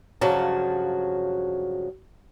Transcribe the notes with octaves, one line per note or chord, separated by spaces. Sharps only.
G2 C#3 F3 F#3 F#4 A5